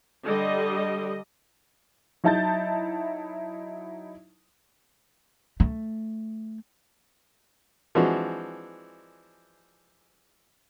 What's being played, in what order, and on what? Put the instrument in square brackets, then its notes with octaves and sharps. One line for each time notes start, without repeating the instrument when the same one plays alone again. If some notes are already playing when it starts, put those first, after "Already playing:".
[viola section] D3 G3 D#5
[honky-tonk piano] F#3 D#4 E4 A5 G6 A6
[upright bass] A3
[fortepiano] E3 F3 G#3 C4 D4 F#4